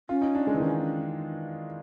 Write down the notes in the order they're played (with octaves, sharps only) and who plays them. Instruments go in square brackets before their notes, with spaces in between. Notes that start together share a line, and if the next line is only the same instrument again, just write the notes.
[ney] C#4 [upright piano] F4
[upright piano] D#4
D4
G#3
E3
D#3